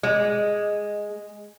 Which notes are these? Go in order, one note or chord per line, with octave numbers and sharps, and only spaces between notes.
G#3